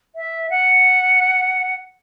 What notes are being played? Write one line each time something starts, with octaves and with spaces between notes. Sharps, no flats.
E5
F#5